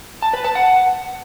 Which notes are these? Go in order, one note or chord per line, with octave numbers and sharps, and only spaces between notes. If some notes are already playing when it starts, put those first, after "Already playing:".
A5
B4
A5
F#5